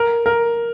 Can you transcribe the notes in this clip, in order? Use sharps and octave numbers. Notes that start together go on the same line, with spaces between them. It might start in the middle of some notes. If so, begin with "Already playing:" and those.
Already playing: A#4
A#4